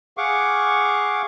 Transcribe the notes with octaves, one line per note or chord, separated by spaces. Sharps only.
G#4 F5 F#5 C#6 D6